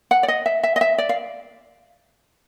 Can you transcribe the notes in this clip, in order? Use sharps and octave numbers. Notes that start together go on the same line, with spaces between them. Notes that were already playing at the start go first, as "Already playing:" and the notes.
F#5
D5
D#5
E5
E5
D#5
E5
D5
F5